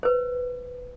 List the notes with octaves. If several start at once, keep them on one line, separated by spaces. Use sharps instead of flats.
B4 C5